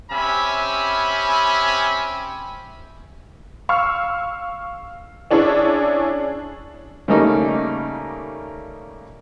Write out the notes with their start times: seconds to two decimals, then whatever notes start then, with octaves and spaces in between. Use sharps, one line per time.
0.11 C4 C#4 G4 E5 G#5 B5
3.69 F5 C#6 E6 F6
5.31 C#4 D4 E4 G#4 C#5
7.08 C#3 G3 A3 A#3 D#4